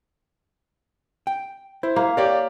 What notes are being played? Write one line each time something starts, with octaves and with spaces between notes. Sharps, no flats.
G5
E4 C5
A#3
G4 A#4 C#5 D5 F5